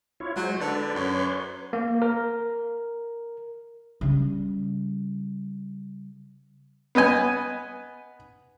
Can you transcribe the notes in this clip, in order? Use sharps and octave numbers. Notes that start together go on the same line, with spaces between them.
E4 F4 C#5
F#3 G#3 C5
D3 B4 D5
F#2 B4 C#5 C6
A#3
A#4
C#3 G3
B3 B4 D#5 G#5